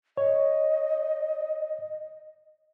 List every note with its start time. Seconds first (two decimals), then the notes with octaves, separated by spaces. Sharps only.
0.17 C#5 D#5